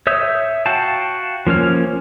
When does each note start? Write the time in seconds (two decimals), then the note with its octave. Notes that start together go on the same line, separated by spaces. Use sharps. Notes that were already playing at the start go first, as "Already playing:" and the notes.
0.07 C#5 E5 D#6 G6
0.66 F#4 F5 G5 A5
1.47 F3 A#3 C#4 F6